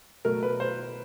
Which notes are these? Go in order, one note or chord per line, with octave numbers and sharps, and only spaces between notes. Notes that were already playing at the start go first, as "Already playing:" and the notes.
B2 F#3 A3 A#4
B4
C5